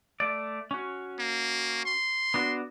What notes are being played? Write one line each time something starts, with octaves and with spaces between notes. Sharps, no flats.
A3 D5
C#4 F#4
A#3
C6
B3 D4 F#4